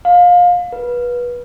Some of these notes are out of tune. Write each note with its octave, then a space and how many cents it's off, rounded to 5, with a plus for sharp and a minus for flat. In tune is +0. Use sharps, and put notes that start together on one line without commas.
F5 +25
B4 -25